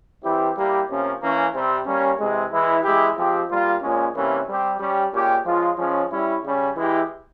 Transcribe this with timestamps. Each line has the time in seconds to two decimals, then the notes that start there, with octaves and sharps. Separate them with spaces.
0.23 E3 G3 C4 E4 G4
0.57 G3 A#3 E4 G4
0.89 C3 F3 A#3 C#4
1.22 E3 A#3 C#4
1.54 C3 G3 C4
1.86 G3 A#3 C#4
2.20 C3 E3 G#3
2.51 E3 G#3 E4
2.84 E3 G#3 E4 G4
3.17 F3 G#3 C4 G4
3.50 G3 A#3 F4
3.82 A#2 F3 G#3 C#4
4.15 C3 E3 G3 A#3 C#4
4.48 G3 C4 G4
4.80 G3 C#4 G4
5.13 A#2 G#3 C#4 G4
5.45 F3 G#3 C#4 F4
5.78 F3 G#3 C#4
6.11 G3 C#4 E4
6.43 C#3 G3 C#4
6.76 E3 G#3 E4 G4